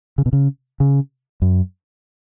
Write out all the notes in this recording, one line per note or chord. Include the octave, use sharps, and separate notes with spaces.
C#3
B2
C#3
C#3
F#2